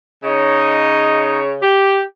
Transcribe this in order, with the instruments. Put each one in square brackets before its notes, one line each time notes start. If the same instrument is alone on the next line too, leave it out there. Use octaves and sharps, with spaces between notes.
[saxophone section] C#3 C#5 [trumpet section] D#4 D#5
[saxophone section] G4